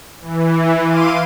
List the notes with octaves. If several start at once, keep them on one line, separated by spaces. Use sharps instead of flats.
E3
E4 F5 C6 D6 D#7